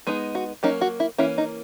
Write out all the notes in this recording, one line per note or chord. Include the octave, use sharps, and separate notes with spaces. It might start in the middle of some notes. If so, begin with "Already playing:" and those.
G#3 B3 D#4 G#4
F#4
F#3 A#3 C#4 D#4
F#4
E4
E3 A#3 C#4 E4
D#4